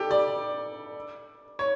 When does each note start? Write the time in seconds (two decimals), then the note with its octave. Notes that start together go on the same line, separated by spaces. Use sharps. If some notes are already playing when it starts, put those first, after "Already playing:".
Already playing: G4 A4
0.11 D5
1.59 C#5